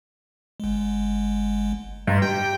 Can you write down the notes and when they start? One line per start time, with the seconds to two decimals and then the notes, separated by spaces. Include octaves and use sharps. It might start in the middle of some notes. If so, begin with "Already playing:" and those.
0.60 G1 G#3
2.07 G2 D#5 A#5 C6
2.22 G4 G5